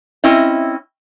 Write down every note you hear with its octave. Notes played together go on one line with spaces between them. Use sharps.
C4 C#4 E4 D#5